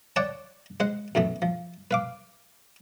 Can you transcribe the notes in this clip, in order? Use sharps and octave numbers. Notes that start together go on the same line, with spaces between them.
C#5 D5 F#5 G5 A5
G#3 C5 F#5
F#2 E3 A3 B3
F3
B4 F5 D6